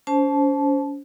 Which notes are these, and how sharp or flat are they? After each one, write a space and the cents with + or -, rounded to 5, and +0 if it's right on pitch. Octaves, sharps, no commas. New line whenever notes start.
C#4 +35 C5 +5 A5 -25